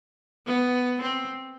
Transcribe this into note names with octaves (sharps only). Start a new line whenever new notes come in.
B3
C4